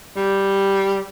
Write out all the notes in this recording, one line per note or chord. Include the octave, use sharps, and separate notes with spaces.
G3